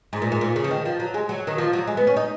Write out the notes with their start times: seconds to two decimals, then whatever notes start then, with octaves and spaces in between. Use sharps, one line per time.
0.13 G#2
0.22 A#2
0.32 G#2
0.41 A#2
0.56 C#3
0.64 F3
0.71 D#3
0.85 F3
1.00 F#3
1.14 G#3
1.29 F#3
1.47 D#3
1.58 F3
1.73 F#3
1.87 G#3
1.97 B3
2.07 C#4
2.17 D#4